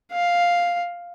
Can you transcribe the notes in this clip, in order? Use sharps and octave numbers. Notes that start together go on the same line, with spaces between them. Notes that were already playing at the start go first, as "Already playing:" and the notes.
F5